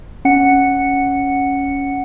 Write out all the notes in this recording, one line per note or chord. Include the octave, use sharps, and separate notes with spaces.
C#4 F#5 C#7